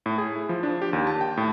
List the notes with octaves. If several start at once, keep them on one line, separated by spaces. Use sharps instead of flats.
A2
G#4
E4
F3
D4
G4
D#2
A5
G5
A2